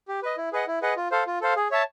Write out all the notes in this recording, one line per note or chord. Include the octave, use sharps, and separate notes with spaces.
G4
B4 D#5
E4
G#4 B4 D#5 F#5
E4
G#4 B4 D#5 F#5
F4
A4 C5 F5
F4
A4 C5 F5
G#4
C#5 E5 A5